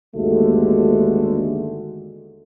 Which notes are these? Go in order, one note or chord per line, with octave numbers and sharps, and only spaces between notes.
G1 D#2 D3 G#3 A3 F#4